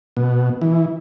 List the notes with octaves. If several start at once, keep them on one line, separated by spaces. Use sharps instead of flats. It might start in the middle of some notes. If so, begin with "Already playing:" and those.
B2
E3